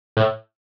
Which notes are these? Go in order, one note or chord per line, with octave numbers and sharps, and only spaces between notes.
A2